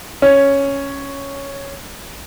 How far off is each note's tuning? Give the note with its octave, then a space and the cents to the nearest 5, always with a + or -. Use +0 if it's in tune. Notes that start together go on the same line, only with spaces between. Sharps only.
C#4 +0